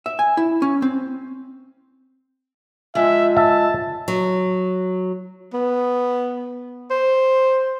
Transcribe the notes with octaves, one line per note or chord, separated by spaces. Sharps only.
E5
G#5
E4
C#4
C4
G#2 F3 G#3 E5
E5 A5
F#3
B3
C5